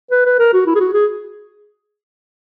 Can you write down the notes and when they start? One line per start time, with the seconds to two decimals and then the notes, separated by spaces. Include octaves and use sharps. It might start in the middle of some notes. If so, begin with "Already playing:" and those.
0.11 B4
0.25 B4
0.39 A#4
0.53 F#4
0.66 E4
0.75 G#4
0.80 F#4
0.93 G#4